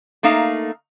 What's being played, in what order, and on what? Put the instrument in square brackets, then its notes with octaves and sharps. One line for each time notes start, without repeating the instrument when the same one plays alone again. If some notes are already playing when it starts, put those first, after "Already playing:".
[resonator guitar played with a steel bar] A3 A#3 D#4 F5